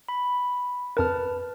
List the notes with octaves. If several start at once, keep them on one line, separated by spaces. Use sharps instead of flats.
B5
F2 A#4 B4 A5 F6